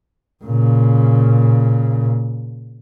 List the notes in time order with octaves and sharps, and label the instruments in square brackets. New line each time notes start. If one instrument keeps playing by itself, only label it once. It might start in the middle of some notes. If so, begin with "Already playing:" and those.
[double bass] A#2 C#3